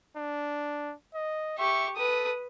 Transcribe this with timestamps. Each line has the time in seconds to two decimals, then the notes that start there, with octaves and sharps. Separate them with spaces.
0.17 D4
1.15 D#5
1.59 G4 E5 C#6
1.97 A4 B4 D#6